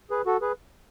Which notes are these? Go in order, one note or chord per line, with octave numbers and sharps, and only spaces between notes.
G#4 B4
F#4 A4
G#4 B4